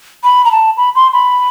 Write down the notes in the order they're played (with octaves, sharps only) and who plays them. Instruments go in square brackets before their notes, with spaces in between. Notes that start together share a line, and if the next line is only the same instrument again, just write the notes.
[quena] B5
A#5
A5
B5
C6
B5